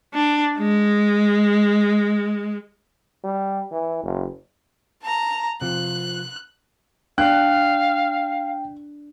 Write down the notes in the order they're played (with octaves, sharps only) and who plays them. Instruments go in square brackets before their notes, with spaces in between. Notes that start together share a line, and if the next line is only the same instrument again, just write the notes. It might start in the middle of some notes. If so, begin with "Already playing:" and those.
[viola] D4
G#3
[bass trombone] G3
E3
F#1
[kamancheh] A5 A#5
[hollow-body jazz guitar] C3 F3 [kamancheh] F#6
[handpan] D4 [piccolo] F5 [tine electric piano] G5 [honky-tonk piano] F#6